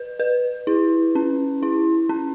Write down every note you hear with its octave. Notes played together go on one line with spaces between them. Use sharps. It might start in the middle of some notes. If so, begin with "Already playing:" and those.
Already playing: B4
B4
E4
C#4
E4
C#4